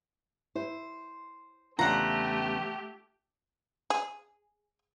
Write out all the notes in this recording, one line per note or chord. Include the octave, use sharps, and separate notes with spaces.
E4 C5
E2 C#3 A3 D4 F4 G4 F#5 A#5
G#4